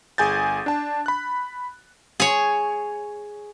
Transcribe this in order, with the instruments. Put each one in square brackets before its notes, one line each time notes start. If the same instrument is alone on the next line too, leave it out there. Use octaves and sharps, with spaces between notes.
[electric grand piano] G1 G#4 G#5 G6 A6
D4 A5
B5 F#6
[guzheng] G#4 C#5